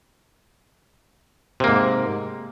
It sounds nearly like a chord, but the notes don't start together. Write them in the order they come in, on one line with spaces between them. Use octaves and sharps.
C3 A#3 G#2